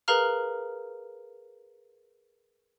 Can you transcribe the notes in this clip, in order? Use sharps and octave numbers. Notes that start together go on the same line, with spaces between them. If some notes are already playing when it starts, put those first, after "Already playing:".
G#4 A#4 B4 F5 A#5 F6